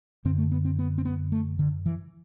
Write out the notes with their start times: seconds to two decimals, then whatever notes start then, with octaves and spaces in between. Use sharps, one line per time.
0.25 F#2 D3 C4
0.38 A3
0.52 B3
0.65 C4
0.79 B3
0.98 C4
1.05 B3
1.32 A3
1.59 D3
1.86 E3